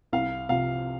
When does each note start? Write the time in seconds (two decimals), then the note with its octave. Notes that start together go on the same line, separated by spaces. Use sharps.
0.13 C2 F5
0.49 C3 F3 F5